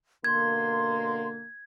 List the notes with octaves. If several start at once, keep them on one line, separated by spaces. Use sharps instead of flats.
B2 D3 A#3 C6 G#6